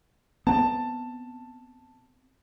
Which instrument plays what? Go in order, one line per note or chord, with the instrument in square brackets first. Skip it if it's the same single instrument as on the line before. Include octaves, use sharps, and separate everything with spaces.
[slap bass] B3 C4 [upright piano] A5